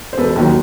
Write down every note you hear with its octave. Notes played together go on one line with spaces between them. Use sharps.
C5
E1 A4 B4
D#2 D#3 F#3